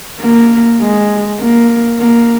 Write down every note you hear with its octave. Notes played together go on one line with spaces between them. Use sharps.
A#3
G#3
A#3
A#3